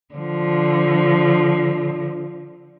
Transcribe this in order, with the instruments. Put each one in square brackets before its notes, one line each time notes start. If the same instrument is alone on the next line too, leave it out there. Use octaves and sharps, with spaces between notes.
[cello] D3 F3